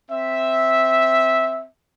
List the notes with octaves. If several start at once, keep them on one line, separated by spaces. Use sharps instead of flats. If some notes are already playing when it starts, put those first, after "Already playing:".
C4 E5